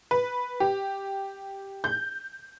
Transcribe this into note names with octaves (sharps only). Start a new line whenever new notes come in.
B4
G4
G6